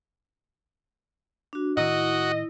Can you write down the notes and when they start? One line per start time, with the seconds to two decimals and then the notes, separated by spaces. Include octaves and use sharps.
1.53 D4 F#4
1.77 A2 D#3 E4 F#4 D#5